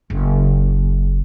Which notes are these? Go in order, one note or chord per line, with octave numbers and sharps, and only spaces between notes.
F#1